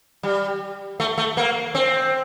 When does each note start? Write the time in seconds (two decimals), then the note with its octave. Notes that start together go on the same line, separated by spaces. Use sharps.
0.23 G3
1.00 A3
1.18 A3
1.37 A#3
1.75 C4